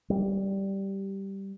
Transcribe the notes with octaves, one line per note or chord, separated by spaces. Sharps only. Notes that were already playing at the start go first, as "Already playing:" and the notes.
G3